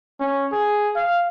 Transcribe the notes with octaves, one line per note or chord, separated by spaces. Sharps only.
C#4
G#4
F5